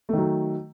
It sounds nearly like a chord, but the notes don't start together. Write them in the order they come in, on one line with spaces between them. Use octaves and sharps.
A3 D#3 F#3